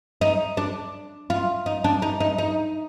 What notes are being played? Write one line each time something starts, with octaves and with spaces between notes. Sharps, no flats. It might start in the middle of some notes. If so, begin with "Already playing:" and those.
D#4
D4
F4
D#4
D4
D#4
D#4
D#4